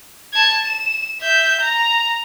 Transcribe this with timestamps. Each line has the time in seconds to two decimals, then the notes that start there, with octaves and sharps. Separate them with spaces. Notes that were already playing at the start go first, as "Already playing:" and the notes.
0.33 A5 G#6
0.64 E7
1.21 E5 G6
1.61 A#5